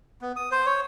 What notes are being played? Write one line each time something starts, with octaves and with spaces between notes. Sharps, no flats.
B3
D#6
C5
C#5